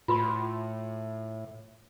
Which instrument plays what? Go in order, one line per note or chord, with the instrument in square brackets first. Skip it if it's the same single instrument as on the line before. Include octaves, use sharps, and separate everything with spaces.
[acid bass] A2 [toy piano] F4 B4 C6